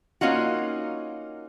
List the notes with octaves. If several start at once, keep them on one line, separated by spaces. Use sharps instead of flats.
A#3 C#4 D#4 F4 F#4